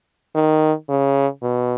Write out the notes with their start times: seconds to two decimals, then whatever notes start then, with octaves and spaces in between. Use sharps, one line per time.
0.35 D#3
0.89 C#3
1.43 B2